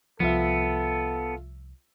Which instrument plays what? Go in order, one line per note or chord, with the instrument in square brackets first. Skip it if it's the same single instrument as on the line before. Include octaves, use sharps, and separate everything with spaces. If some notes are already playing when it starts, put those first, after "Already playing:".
[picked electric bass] C2 F3 [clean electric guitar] B3 [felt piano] F4 E5 [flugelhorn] A4